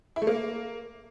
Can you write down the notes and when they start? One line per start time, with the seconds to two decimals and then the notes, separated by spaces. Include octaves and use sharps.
0.16 E4
0.22 A3
0.27 A#3